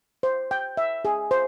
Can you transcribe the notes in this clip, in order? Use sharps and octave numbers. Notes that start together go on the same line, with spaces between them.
C5
G5
E5
G#4
C5